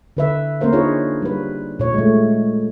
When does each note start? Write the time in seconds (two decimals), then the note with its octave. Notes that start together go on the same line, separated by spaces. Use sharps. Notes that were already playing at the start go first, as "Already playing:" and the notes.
0.17 D3 B4 E5
0.61 A#3 C#4 A#4 C5 F5
0.73 D4 D#4 F4 G#4 B4 C#5
1.22 G3 B4
1.79 A#2 C#5
1.94 G#3 A3